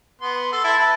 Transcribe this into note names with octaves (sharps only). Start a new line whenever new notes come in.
B3 C6
A4 C6
E4 A5
B4